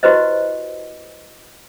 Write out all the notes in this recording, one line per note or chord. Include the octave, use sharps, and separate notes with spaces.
E4 F#4 G4 B4 C5 D#5